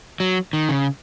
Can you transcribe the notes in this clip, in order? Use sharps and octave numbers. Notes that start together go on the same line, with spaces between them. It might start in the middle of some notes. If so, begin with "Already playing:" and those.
F#3
D#3
C#3